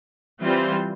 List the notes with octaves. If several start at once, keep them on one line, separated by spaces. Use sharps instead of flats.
E3 G3 C4 F4 C5